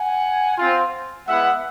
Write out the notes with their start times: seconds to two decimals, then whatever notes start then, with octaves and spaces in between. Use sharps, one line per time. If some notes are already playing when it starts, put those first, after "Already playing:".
Already playing: F#5 G#5
0.58 C4 F4
1.27 G#3 B3 E4 E5 F#5